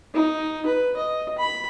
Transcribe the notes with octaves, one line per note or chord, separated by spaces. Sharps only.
D#4
B4
D#5
B5